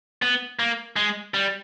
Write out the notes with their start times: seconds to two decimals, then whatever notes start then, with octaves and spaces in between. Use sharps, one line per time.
0.22 B3
0.59 A#3
0.96 G#3
1.34 G3